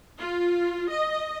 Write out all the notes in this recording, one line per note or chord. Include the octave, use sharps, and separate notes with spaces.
F4
D#5